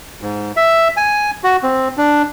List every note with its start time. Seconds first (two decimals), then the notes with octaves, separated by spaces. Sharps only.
0.22 G#2
0.57 E5
0.97 G#5
1.44 F#4
1.63 C4
1.98 D4